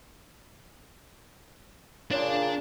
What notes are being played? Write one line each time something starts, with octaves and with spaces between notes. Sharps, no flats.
A#2 C#3 D4 D5